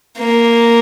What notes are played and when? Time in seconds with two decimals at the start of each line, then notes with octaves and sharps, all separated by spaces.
0.19 A#3